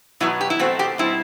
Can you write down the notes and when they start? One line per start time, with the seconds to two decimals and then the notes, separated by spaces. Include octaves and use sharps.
0.20 B2 F#3 B3 E4
0.41 G4
0.50 E4
0.59 B2 A3 C4 F#4
0.79 G4
0.98 B2 G3 C4 E4